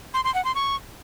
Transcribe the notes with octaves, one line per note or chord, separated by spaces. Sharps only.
C6
C6
F#5
C6
C#6